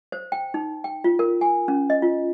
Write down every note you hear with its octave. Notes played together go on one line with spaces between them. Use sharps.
C5
G5
D#4
G5
F4
A#4
G#5
C#4
D#5
F4